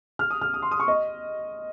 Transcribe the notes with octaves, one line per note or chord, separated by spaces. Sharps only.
F6
D#6
F6
D#6
C6
D#6
C#6
D#5